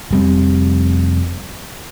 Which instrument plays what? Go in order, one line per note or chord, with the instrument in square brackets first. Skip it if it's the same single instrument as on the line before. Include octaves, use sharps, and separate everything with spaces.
[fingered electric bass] F1 G3 C4